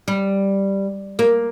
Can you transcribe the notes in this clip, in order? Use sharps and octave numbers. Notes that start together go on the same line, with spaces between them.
G3
A#3